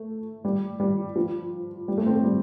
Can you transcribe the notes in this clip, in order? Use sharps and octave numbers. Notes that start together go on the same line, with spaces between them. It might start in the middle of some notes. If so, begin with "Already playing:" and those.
Already playing: A3
G3
G3
F3
G3
A3
C4
A3
G3